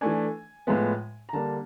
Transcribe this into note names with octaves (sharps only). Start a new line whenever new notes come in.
E3 A3 D4 G#5
A2 F3 G#3 B3
A#5
D3 G3 A#3 D4 A5